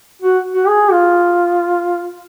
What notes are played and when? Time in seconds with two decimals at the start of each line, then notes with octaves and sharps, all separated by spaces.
0.22 F#4
0.53 F#4
0.68 G#4
0.92 F4